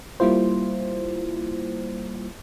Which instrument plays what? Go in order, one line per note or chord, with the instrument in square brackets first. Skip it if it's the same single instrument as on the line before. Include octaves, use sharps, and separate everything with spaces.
[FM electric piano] G3 A#3 E4 F4 C5